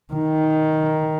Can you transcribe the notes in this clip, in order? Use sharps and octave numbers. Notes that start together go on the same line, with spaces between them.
D#3